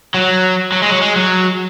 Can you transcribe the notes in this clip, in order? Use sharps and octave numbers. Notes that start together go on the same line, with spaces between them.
F#3
F#3
G#3
F#3
G#3
F#3